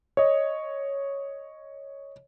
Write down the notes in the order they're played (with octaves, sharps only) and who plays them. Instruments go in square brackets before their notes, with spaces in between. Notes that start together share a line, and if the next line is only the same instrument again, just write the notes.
[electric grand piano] C#5 D#5